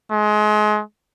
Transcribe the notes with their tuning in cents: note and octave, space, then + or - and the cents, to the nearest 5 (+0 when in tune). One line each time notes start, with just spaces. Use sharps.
G#3 +30